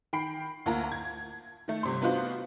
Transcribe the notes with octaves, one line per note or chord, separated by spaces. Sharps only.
D#3 G5 B5 C7
D2 A#3 F4 A5 A#5
G#6
D#3 A3
G1 C3 C6
B3 D4 D#4 F4 F#4 C5